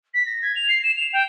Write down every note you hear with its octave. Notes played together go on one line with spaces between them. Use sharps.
B6
A#6
G#6
F7
C7
E7
F7
G5